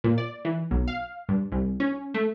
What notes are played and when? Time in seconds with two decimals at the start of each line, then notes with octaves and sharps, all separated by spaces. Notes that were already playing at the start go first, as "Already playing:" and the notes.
0.04 A#2
0.18 D5
0.45 E3
0.71 B1
0.88 F5
1.29 G2
1.52 C2
1.80 C#4
2.14 A3